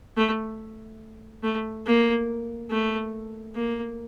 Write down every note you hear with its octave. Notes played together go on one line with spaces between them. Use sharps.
A3
A3
A#3
A3
A#3